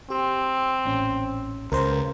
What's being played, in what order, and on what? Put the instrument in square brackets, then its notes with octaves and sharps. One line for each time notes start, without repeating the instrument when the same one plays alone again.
[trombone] C4 [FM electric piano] G4
[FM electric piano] A1 A#2 C#4
[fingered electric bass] C#2 [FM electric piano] A#4 C5 A#5